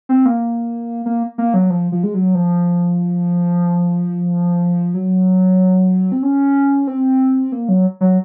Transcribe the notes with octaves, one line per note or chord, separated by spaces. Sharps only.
C4
A#3
A#3
A#3
F#3
F3
F3
G#3
F#3
F3
F#3
C4
C#4
C4
A#3
F#3
F#3